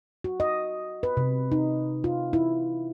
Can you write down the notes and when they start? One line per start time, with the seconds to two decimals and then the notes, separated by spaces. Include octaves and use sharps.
0.24 F#4
0.40 D#5
1.03 B4
1.17 C3
1.52 D#4
2.04 F4
2.33 E4